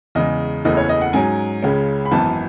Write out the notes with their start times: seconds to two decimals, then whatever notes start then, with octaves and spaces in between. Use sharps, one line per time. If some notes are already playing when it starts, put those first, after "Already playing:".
0.15 E2 C#3 G#3 D#5
0.65 F#1 E2 C#3 E3 A3 D#5
0.77 C#5
0.89 D#5
1.01 F#5
1.13 G#2 F#3 C#4 G#5
1.62 C#2 C#3 G#3 C#4
2.06 B5
2.11 G#1 F#2 E3 B3 A5